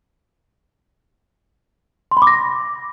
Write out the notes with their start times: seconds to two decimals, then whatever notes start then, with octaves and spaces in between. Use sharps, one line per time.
2.11 C6
2.17 B5
2.22 D6
2.27 A#6